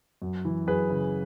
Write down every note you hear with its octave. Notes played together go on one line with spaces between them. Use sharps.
F#2
E3
F#2 G#4 B4
C#3